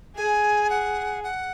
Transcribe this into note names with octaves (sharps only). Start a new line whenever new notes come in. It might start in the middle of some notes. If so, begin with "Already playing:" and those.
G#4 G#5
F#5
F#5